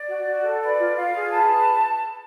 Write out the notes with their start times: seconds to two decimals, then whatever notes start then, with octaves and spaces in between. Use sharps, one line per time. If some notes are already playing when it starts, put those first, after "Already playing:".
Already playing: D5
0.08 F#4
0.25 F#4
0.43 A4
0.60 B4 D5
0.78 F4
0.96 F4 F5
1.12 G#4
1.30 B4 A5